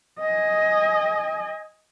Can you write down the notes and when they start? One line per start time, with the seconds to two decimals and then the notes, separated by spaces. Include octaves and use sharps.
0.19 D#5 G#5